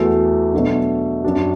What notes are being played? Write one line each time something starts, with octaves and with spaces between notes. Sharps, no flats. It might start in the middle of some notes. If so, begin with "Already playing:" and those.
Already playing: E2 E3 A3 F#4
B2 F#3 A3 D4
F#2 F#3 D4 F#4